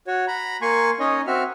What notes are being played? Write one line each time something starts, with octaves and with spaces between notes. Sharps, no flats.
F#4 C#5
A#5 B5
A#3 G#5 C6 C#6
C#4 D#4 C#5 D#5
C4 F#4 E5 F6